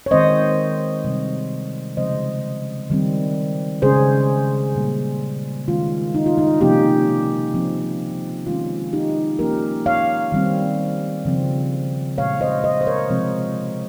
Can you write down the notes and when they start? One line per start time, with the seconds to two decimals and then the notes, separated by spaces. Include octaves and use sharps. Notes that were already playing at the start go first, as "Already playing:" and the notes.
0.06 C#5
0.11 D#3 G#3 C4 C5 D#5
1.04 C3 G3 C4
1.97 C#3 F3 G#3 C4 C5 D#5
2.90 D#3 G3 C4
3.82 C#3 G#3 C#4 G#4 C5
4.76 A#2 G3 A#3
5.68 D#3 G#3 C#4 F4
6.15 D#4
6.26 F4
6.38 D#4
6.60 C3 F3 A#3 C#4 D#4 G4
7.54 F3 C4
8.46 D#3 G#3 C#4 F4
8.93 D#4 G4
9.39 F3 A#3 C#4 G4 A#4
9.86 C#5 F5
10.32 D#3 G3 C4
11.25 C#3 F3 C4
12.17 A#2 G#3 C#4 C#5 F5
12.41 C5 D#5
12.64 C5 D#5
12.81 C5
12.87 A#4 C#5
13.10 C3 F3 G#3 C4